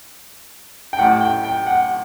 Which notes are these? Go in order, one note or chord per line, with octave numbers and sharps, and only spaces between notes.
G5
A1 A2 F#5
G5
G5
F#5